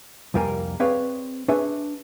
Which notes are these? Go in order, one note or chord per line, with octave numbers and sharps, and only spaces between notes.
C2 F2 G3 A#3 A#4 G#5
C4 G#4 B4 C#5 D5 F5
D4 G#4 B4 C#5 E5